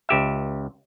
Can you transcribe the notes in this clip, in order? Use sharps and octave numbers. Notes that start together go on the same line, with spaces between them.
C#2 G4 E5